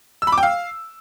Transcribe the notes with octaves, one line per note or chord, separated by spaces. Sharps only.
E6
B5
D6
G5
F5